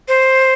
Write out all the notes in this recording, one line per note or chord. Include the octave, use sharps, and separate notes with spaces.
C5